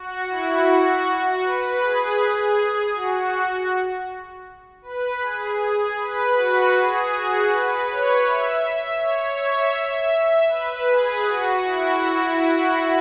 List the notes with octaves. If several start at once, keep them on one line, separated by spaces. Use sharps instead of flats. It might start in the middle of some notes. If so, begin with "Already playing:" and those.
Already playing: F#4
E4
F#4
B4
G#4
F#4
B4
G#4
B4
F#4
G#4
F#4
B4
C#5
E5
E5
C#5
E5
E5
B4
G#4
F#4
E4